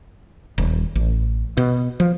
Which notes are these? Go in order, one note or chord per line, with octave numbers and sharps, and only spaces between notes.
D#1
A1
B2
F3